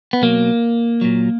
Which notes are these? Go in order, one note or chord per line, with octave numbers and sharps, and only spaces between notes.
B3
B2 F#3 A#3
A#2 F#3